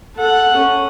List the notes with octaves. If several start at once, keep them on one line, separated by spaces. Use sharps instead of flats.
A4 F#5
C#4